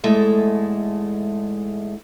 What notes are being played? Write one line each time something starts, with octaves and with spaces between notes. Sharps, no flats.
E2 G#2 G#3 A3 A4 E5